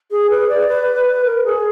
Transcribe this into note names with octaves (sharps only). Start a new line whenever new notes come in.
G#4
B4
D5
B4
A#4
G#4